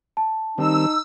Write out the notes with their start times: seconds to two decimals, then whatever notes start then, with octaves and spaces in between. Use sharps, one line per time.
0.17 A5
0.58 D#3 G3 C4 D#4 E6